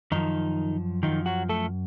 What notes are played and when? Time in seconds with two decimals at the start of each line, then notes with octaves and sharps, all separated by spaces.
0.12 F#2 D#3 F3 D#4
1.03 F#2 D#3 F3 D#4
1.26 F#3 F#4
1.49 A3 A4